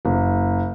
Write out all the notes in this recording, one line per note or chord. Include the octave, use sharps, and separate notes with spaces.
F#1